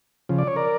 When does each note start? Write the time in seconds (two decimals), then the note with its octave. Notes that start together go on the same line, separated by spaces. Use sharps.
0.29 C#3 F3
0.38 D5
0.48 C#5
0.56 A#4 D5